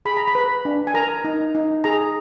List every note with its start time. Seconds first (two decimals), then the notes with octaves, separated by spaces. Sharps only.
0.05 G#4 B5
0.17 A#5
0.28 B5
0.35 B4
0.65 D4
0.87 G#5
0.94 A#4 A#5
1.24 D#4
1.55 D#4
1.84 G#4 A#5